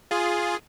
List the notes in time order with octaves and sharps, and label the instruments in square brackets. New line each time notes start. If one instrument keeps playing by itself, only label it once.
[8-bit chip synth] F4 G#4